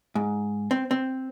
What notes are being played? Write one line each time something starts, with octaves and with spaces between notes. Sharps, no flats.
G#2
C4
C4